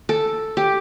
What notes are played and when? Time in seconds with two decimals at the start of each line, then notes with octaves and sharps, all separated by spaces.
0.09 A4
0.57 G4